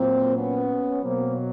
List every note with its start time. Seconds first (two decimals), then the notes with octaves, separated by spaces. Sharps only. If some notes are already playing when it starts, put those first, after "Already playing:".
Already playing: A#2 F#3 A#3 C4
0.36 B3 C#4
1.03 B2 F#3 A#3 C4